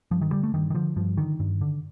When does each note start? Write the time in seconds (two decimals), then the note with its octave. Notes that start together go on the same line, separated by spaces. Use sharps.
0.11 G2 F3
0.21 D#3
0.33 D3 G3
0.43 A3
0.54 G2 D#3
0.70 D#3
0.75 D3 F3
0.96 G2 F3
1.17 D3 D#3
1.40 G2
1.61 D3